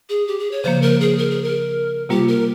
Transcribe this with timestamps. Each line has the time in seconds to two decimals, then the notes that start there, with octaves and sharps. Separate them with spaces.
0.09 G#4
0.27 G4
0.39 G#4
0.51 C#5
0.63 C#3 F3 A#3 C5
0.82 A#4
1.00 G#4
1.18 A#4
1.31 G#4
1.43 A#4
2.09 C3 G3 A#3 F4 G4
2.28 A#4